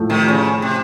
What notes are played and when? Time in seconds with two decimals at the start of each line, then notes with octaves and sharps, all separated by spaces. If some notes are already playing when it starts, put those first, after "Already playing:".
Already playing: A2 F3 A3
0.10 C3 D#3
0.29 C#3
0.62 C3